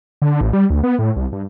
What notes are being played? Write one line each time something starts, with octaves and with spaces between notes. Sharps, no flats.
D3
A1
G3
D2
B3
A2
C2
G2